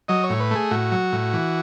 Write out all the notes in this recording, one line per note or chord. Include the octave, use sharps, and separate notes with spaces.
F#3 D#5
C#5
A2
B4
A3 G#4
A2 F#4
F#3
A2
E3